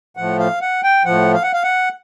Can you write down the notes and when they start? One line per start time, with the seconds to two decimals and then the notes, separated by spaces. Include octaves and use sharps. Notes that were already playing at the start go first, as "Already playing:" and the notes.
0.17 A2 F3 F#5
0.39 F5
0.61 F#5
0.83 G5
1.05 A2 F3 F#5
1.34 F5
1.43 F#5
1.53 F5
1.64 F#5